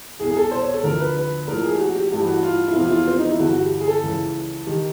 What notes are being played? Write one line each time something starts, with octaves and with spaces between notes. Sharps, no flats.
C2 B2 G#4
G#4
A4
C5
C#5
A4
D2 D3 F3 A#4
B4
B4
A#1 A2 F3 A#4
G#4
G4
F#4
G4
A1 G2 E3 G4
F#4
F4
E4
E2 C3 F3 F4
E4
F4
C4
D#4
E4
G1 G2 E3 F#4
F#4
G4
G#4
A4
C#2 C#3 E3
D#3 G4